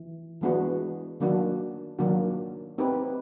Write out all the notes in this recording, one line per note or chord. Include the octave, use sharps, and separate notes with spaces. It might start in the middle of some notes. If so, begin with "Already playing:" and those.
Already playing: E3
E3 G#3 B3 D4 F#4
D#3 F#3 A#3 D4 F#4
D#3 F#3 A#3 D4 F#4
C4 D#4 G4 B4